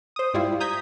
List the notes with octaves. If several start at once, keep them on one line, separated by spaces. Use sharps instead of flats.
C5 D#6
G#2 G3 E4 F4
A#5 D#6 G6 G#6 B6